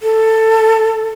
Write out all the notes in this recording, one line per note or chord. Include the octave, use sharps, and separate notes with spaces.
A4